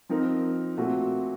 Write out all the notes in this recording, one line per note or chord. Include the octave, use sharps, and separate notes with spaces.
F3 C4 D#4 A#4
A#2 A3 C4 F#4